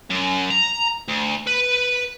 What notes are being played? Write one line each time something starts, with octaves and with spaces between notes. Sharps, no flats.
F#2
A#5
D2
B4